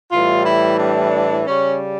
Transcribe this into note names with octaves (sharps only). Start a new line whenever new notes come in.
A2 E3 G3 F4
E4
D4
C#3 G3 C#4